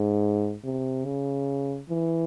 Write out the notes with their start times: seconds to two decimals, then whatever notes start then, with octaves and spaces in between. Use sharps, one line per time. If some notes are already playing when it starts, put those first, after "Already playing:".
Already playing: G#2
0.64 C3
1.05 C#3
1.90 E3